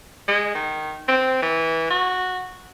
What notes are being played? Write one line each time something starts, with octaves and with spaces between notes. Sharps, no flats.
G#3
D#3
C4
E3
F#4